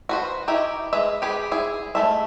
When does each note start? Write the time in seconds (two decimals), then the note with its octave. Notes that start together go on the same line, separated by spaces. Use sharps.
0.09 F#4 B4 C5
0.48 D#4 E4 G4
0.93 G#3 B4 E5
1.22 G4 G#4 B4
1.52 E4 G#4
1.95 G#3 A3 E5